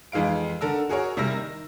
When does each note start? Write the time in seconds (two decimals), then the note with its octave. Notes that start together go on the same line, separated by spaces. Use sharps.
0.12 F2 E3 G#3 F5 D7
0.61 D3 A4 A#4 E6
0.89 F#4 G#4 A#4 C#5
1.17 C3 G3 E4 A#4 E6 A#6
1.37 D#3